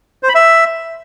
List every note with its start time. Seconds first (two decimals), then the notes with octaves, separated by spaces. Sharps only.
0.23 C5
0.29 B5
0.35 E5